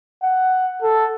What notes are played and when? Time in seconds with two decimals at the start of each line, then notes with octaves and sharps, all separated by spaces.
0.23 F#5
0.82 A4